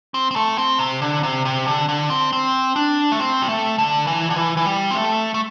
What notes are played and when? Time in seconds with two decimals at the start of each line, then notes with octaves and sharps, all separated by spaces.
0.14 C4
0.31 C4
0.36 A3
0.58 C4
0.79 C3
1.02 D3
1.23 C3
1.45 C3
1.68 D3
1.89 D3
2.10 C4
2.33 C4
2.76 D4
3.12 A3
3.20 C4
3.42 G3
3.49 A3
3.78 D3
4.07 E3
4.30 D3
4.36 E3
4.57 E3
4.66 G3
4.91 C4
4.95 A3
5.34 A3